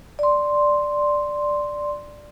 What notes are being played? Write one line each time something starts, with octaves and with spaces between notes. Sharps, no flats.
D5 C6